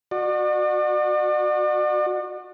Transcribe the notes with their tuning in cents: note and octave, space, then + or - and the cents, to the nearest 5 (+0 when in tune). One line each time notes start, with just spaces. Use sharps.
F#4 -20 D5 +40